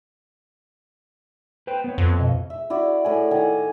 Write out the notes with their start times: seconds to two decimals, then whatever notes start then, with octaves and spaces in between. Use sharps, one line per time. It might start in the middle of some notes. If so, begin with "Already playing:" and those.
1.67 B4 C5 G5
1.84 B3 B4 C#5
1.98 F2
2.19 B2 D#5
2.50 E5
2.70 E4 F#4 D5
3.04 A2 G#5
3.31 D#3 F#5 G#5